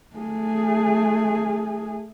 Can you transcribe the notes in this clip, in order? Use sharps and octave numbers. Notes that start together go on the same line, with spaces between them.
A3 G#4